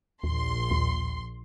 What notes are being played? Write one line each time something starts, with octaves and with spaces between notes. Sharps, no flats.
A#1 D#2 C6
D#2